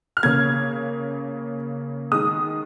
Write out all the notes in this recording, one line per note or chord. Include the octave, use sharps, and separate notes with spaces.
F6
C#3 A#3 G#6
D#3 G#3 D#6